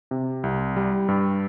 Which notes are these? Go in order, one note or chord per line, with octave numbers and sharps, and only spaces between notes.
C3
C2
G3
G2